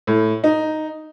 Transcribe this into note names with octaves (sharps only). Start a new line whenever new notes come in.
A2
D#4